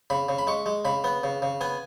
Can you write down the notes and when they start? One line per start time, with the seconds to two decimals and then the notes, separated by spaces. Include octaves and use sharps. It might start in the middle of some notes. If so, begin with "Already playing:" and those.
0.10 C#3 B5
0.29 C#3
0.38 B5
0.47 G#3 C#6
0.66 G#3
0.85 C#3 B5
1.04 B3
1.24 C#3
1.42 C#3
1.61 B3 G#5